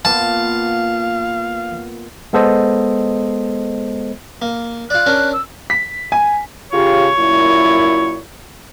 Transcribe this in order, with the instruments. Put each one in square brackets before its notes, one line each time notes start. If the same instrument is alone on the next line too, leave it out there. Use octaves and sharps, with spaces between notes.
[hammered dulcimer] A#2 B3 [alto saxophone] F5 [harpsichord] A5
[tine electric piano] G#3 B3 A4 C5 D#5
[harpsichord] A#3
[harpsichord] F4 D5 [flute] F#6
[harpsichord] C#4 D4 A#4
[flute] E6
[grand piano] B6
G#5
[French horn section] C#3 F4 G4 [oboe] C#5
[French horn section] F#2 A#2 E4